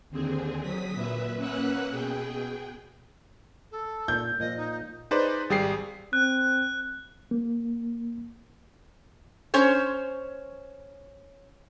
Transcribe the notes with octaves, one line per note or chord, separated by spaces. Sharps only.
D#2 D3 C4 G#4
F#3 D#6 B6
A#2 B4 E5
A#3 C#4 B4 F#5 E6 F#6
B2 G#4 G5
A4
A#2 G6
A#2 F3 D#5
D#4
D#4 G#4 B4 C5 D5
G#1 G3 G#4 G5 C7
C4 F#6
A#3
C#4 C5 C#5